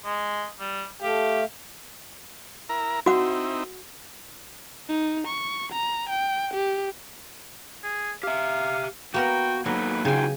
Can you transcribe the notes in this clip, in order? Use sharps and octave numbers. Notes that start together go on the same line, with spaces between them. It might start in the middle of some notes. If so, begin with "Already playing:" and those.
G#3
G3
A3 G4 F5
E4 A#4 A#5
C4 D#4 E4 F#4 F#5
D#4
C#6
A#5
G5
G4
G#4
G4 E5 F5
A#3 B3 F#4 A#4 G5
F#3 A#3 D#4 A4 B4
C#3 D#4 F4 F#4 G5 G#5